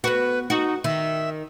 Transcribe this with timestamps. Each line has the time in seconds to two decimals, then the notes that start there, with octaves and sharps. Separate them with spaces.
0.04 B3 F#4 B4
0.50 D#4 F#4
0.84 D#3 E5